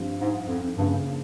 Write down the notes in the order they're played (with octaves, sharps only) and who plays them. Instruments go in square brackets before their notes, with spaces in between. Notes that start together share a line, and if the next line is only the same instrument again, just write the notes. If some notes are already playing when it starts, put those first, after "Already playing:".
Already playing: [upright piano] G2 F3 C4
[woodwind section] G#2
F2
[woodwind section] G2 [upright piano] C#3 F3 A#3